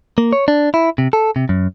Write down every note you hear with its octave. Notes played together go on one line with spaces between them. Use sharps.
A#3
C#5
D4
E4
C3
A4
C3
F#2